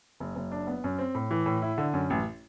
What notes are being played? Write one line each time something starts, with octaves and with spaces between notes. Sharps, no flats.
F#1
F#1
D4
B3
F#2
C4
A2
E3
A2
E4
D3
F#2
A1